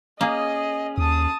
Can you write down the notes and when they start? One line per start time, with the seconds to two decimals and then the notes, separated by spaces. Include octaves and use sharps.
0.21 A#3 C#4 G#4 D#5
0.98 D#2 A5 D#6